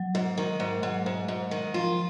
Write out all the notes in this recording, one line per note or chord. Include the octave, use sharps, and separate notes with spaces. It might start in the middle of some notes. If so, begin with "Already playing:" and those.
Already playing: F#3
G#2
D#3
G#2
G#2 F#3
G#2
G#2
D#3
F3 F4